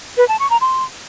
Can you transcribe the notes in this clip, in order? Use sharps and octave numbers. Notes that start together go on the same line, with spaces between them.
B4
A5
C#6
A#5
C6